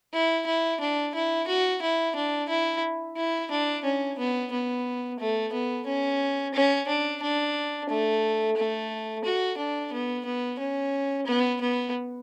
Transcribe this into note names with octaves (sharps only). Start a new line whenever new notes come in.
E4
E4
D4
E4
F#4
E4
D4
E4
E4
D4
C#4
B3
B3
A3
B3
C#4
C#4
D4
D4
A3
A3
F#4
D4
B3
B3
C#4
B3
B3